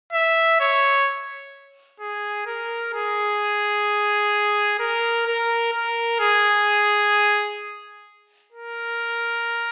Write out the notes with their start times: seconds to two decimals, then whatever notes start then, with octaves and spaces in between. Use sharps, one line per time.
0.12 E5
0.60 C#5
2.00 G#4
2.46 A#4
2.93 G#4
4.79 A#4
5.26 A#4
5.73 A#4
6.20 G#4
8.53 A#4